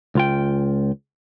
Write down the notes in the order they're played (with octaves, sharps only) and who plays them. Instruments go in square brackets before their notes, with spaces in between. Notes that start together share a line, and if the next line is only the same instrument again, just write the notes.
[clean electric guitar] C#2 F4 G5